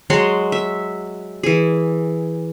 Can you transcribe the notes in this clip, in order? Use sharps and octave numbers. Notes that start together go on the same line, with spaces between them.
F#3 G#3 F#4 C6
E5
E3 G#4